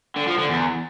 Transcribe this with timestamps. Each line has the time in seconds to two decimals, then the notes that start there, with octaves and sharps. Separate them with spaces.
0.16 D3
0.27 F3
0.38 D3
0.49 E2